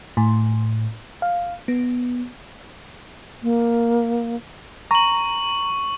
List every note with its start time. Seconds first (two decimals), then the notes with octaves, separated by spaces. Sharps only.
0.17 A2
1.22 F5
1.68 B3
3.43 A#3
4.91 A#5 C#6 F#7